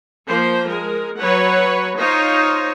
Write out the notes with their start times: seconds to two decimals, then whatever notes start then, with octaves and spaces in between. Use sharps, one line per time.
0.25 F3 A#3 C5
0.66 G#3 A#4
1.18 F#3 B4 C#5 F#5
1.96 D#4 F4 C5 C#5